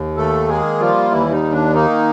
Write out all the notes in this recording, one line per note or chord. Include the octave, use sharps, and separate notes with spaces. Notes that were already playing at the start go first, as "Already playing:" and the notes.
Already playing: D#2
D#3 A3 A4
G#3 A#3 G#4
F3 G3 F4
D#2 E3 E4
D#4
D#3
D4
A#3 D#4